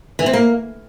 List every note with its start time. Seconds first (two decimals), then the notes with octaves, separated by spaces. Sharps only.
0.19 E3
0.26 C4
0.33 A#3